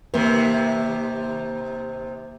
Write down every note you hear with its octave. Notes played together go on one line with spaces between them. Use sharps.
D#2 C3 A#3 B4